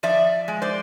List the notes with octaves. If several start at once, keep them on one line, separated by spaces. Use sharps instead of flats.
F3 D5 E5
G#3
C5 D5